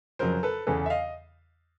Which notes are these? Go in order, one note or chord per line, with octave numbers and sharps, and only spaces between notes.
F2 C#3 F#3 A#4 C5
A4 B4
E2 C#3 E3 A4 B4
E5
D#5 F5